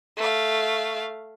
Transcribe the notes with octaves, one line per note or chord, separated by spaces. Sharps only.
A3 F5